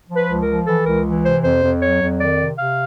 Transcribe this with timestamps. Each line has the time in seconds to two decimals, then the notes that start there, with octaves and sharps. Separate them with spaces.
0.10 F3
0.16 B4
0.29 C#2
0.42 A#4
0.48 F3
0.67 E3 A4
0.86 C#2 A#4
1.05 E3
1.24 C3 C5
1.43 F2 C5
1.62 F2
1.81 F#3 C#5
2.01 F2
2.19 D#3 D5
2.39 C3
2.58 C3 F5